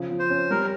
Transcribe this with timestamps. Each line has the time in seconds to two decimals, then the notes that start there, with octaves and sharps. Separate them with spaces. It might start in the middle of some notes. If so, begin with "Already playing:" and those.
Already playing: C#3 F3
0.11 F3
0.19 C5
0.30 C#4
0.50 G3 A#4